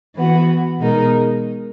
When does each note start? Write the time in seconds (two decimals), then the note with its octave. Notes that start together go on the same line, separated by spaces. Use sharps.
0.16 E3 B3 F#4
0.80 B2 G#3 D#4 A#4